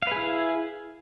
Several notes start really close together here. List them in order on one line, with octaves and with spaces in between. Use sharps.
F5 B4 G#4 E4